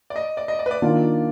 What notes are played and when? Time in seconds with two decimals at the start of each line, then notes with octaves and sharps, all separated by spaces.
0.10 D5
0.16 D#5
0.37 D5
0.48 D#5
0.59 D5
0.66 B4
0.71 D5
0.82 D#3 A#3 D4 F4